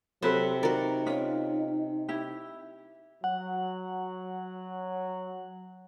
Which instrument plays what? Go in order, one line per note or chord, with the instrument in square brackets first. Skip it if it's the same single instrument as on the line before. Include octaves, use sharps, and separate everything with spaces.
[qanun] C3 [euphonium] F#3 [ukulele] A4 B4 C5
[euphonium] D#4 [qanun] F#4 D5 [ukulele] A#4
[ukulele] C#4 F4
E4 G4
[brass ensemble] F#3 [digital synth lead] F#5